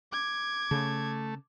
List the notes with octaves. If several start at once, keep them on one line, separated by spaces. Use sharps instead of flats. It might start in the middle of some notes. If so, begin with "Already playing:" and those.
D6 G#6
C#3 A3